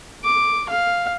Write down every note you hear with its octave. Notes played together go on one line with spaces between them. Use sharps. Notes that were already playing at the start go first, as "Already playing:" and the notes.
D6
F5